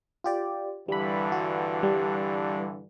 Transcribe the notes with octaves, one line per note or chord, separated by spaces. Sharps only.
F4 G4 D5
G2 D3 E3 G3 B5
F#4
G3